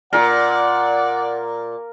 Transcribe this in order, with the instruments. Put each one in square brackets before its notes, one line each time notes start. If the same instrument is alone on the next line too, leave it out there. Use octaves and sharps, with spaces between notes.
[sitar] A#2 [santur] A#4 [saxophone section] D5 [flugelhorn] F#5